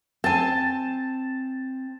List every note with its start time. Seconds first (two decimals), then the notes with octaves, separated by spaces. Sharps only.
0.24 C4 G#5 A5